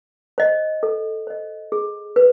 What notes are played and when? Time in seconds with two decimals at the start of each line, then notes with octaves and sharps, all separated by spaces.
0.38 C5 D#5
0.83 A4
1.27 C5 D#5
1.72 G#4
2.16 B4